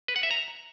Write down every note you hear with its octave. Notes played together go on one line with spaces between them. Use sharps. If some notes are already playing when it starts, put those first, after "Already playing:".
B4
F#5
E5
A#5